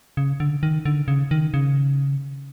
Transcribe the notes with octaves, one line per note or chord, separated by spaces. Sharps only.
C#3
D3
D#3
D3
C#3
D#3
C#3